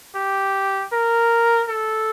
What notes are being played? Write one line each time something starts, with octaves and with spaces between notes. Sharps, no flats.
G4
A#4
A4